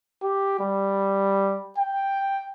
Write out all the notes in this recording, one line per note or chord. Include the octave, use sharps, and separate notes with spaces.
G4
G3
G5